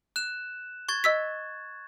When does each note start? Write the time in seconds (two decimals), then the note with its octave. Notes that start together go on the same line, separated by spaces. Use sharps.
0.16 F#6 E7
0.89 C#6 G#6 A6
1.04 D#5 E6 B6